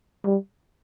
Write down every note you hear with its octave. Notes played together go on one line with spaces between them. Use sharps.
G3